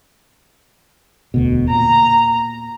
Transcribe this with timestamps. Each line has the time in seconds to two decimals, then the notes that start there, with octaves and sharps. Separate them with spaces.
1.34 E1 D2 B2
1.70 A#2 A#5